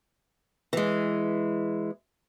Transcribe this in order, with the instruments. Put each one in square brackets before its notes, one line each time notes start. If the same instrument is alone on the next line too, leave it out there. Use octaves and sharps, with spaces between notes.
[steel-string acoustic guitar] E3 G#3